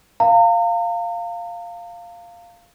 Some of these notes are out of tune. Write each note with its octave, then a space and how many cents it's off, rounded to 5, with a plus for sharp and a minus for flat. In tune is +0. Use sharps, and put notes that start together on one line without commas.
F5 -5 A#5 -40